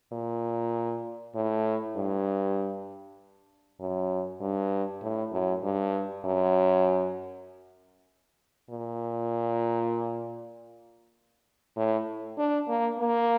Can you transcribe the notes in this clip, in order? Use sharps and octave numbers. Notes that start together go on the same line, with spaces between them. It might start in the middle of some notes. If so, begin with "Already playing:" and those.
A#2
A2
G2
F#2
G2
A2
F#2
G2
F#2
A#2
A2
D4
A#3
A#3